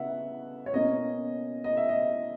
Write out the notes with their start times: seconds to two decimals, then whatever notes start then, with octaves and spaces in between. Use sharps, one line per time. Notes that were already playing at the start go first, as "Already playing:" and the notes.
Already playing: C#3 B3 E5 F#5
0.66 C#5
0.74 B2 A#3 C#4 D#5
1.64 D#5
1.77 E5
1.89 D#5